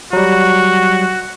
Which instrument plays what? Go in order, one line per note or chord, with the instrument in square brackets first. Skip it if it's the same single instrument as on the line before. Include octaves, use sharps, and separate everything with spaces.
[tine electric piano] F#3 G3 [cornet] F#4